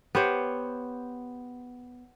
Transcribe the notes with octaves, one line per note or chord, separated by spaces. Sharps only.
B3 G4 C5 C#5